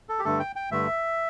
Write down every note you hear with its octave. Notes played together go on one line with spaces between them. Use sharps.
A4
G4
G2 D3 A3 A4
G5
G5
G2 D3 A3 E5